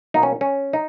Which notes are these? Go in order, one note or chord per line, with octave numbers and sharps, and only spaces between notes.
B2 F#3 A#3 D#4
C#4
C#4
D#4